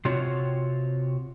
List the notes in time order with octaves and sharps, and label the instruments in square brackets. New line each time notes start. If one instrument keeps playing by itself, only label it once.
[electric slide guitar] C3 C4 F4 F#4 C#5